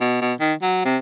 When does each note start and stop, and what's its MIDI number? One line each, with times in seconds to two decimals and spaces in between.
0.01 0.21 47
0.22 0.33 47
0.40 0.54 51
0.62 0.83 54
0.85 0.97 48